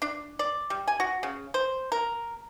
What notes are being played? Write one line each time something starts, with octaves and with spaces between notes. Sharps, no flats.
D4
D5
G3
G#5
F#4
C#3
C5
A#4